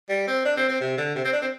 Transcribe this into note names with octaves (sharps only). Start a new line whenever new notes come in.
G3
C4
D4
C4
C4
C3
D3
C3
C4
D4
C4